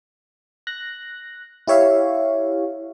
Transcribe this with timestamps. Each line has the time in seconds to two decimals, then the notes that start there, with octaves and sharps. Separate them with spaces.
0.67 F#6 A#6
1.68 E4 G4 C#5 E5 F5